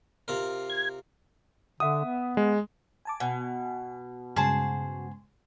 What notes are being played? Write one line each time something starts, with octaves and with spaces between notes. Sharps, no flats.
C3 F4 A#4
G#6
D3 E5 F#5 D#6
B3
G#3
G#5 A5 D6
B2 G#5
G2 C#3 G#3 G#4 C5 A5